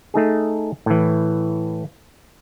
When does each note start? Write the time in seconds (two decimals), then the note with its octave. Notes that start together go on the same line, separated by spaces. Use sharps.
0.14 A3 D#4 G#4
0.86 A2 E3